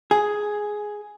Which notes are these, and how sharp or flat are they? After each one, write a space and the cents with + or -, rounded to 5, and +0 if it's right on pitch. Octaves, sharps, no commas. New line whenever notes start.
G#4 +5